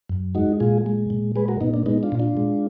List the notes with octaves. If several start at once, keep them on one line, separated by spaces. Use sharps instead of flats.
F#2
G#3 D#4 F#4
A#2 F4 G#4
G#3
A#2
G#3 G#4 B4
F#4 A#4
A#2 B3 D#4
A#3 D4
G#3 B3 D#4
D4 F4
A#2
D4 F4
G#3